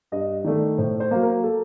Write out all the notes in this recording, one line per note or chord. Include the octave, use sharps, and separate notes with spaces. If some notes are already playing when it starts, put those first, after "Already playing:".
G2 D#5
D#3 A3 D5
A2 C5
C5
F#3 A#3
A#4
A4